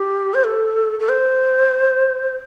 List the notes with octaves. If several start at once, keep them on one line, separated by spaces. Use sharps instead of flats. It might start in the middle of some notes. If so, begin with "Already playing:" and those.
Already playing: G4
C5
A4
A4
C5